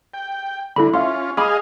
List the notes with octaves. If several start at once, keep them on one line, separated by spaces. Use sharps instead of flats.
G5
D3 E4 A4 B5
C#4 F4 E5 F5 C6
G#4 D#5 F5 B5 D6 D#6